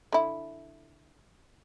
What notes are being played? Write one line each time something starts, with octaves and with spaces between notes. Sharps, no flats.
D3 E4